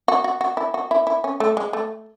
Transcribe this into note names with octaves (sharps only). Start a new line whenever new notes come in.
F#4
F#4
F#4
E4
F#4
E4
E4
C#4
A3
G#3
A3